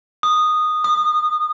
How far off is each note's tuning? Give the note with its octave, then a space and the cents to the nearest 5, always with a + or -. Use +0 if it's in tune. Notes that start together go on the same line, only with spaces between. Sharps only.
D#6 -10
D#6 -25